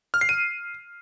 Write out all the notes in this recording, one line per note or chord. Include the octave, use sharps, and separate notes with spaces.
F6
C7
D#7